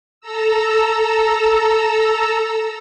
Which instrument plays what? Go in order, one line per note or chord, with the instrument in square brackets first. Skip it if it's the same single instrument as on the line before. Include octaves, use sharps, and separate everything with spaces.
[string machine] A4 A#5 E6